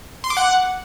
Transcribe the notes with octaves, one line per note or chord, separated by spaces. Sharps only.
C6
D6
F#5